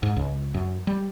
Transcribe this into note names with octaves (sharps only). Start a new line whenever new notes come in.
G#2
C#2
F#2
G3